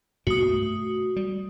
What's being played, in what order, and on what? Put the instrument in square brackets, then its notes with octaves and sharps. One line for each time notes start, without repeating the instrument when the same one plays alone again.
[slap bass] G2 B2 A#3 [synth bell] F#4 D#6
[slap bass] A3
G3